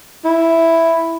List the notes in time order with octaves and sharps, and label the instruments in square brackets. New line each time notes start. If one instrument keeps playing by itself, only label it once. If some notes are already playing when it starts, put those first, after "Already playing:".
[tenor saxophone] E4